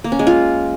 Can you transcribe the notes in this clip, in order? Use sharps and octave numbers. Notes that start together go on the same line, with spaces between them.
A#3
C#4
G#3
F4